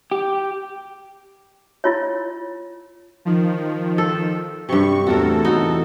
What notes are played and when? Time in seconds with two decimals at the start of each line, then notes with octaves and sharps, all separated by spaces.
0.12 G4
1.84 E4 F4 C#5
3.25 D#3 F3
3.98 A4
4.69 G2 C3 C#6
5.07 E2 A2 F#4 A4 A#4
5.45 D#4 F#4